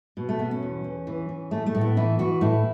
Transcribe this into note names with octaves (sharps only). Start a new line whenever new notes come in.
B2
A3
B2 B3
C#4
E2
E2
E3
E3
A2 A3
A3
A2
B3
E3 E4
E3 F#4
A2 E4